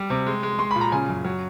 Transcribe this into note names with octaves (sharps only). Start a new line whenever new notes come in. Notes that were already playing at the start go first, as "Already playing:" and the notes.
Already playing: G3
C3
G#3
G#3
G#3 C6
B5
A#2
A#5
C#3 G#5
F#2
F#3